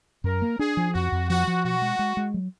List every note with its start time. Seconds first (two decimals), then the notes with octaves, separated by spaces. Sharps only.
0.24 F#2 A#4
0.42 A#3
0.59 D4 G#4
0.77 F3
0.94 F2 F#4
1.12 F2
1.29 F3 F#4
1.47 F3
1.64 B2 F#4
1.82 G#3
1.99 G#3
2.17 G#3
2.34 F#3